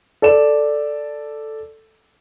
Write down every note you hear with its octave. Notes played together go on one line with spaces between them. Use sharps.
A4 D5 E7